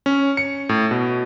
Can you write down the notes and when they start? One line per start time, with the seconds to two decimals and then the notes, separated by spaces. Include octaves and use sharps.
0.06 C#4
0.37 C#7
0.69 A2
0.91 B2